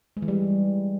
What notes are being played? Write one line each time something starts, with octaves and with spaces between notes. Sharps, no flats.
G#3
E3
G3